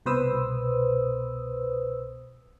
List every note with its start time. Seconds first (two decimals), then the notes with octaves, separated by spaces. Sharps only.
0.06 C2 B2 B4 C5 D#6 E6